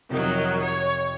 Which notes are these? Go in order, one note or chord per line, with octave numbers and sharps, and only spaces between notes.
F2 C3 D#3 F#3
C#5